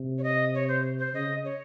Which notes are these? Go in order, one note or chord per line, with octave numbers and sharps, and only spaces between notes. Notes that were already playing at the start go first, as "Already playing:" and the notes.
Already playing: C3
C#5
D#5
C#5
C5
C5
C#3 D#5
C#5